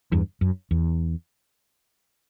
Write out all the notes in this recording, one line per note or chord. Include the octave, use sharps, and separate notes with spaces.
E2 G2
F#2
E2